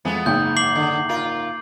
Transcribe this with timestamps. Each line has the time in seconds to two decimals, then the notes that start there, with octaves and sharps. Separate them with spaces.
0.05 F2 E3 G#3 B3
0.26 F#1 G#2 G5 G6
0.56 D6 C7 F#7
0.75 D3
1.09 F4 A#4